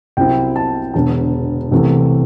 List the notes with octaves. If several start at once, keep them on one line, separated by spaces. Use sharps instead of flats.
C2 C3 F#3 C4 E4 G5
A5
E1 E2 D3 A5
C2 C3 E3 A3